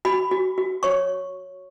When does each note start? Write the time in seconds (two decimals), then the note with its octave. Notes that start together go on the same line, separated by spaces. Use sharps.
0.05 F#4 B5
0.31 F#4
0.58 F#4
0.83 C#5 C#6